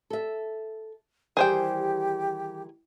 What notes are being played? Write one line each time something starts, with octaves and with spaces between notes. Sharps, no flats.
A4 E5
D#3 E3 G3 G4 G#4 C5 G5